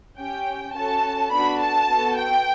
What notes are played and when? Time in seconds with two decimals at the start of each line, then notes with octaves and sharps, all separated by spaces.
0.18 C#4 G4 G5
0.75 C#4 F#4 A4 A5
1.32 B3 D4 F#4 A4 B5
1.60 A5
1.89 B3 F#4 A4
2.17 G5